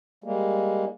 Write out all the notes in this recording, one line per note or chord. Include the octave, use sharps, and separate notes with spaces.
G3 G#3 A#3